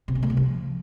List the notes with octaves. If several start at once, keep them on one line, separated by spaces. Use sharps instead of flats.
C3
C#3
A3
C3
F3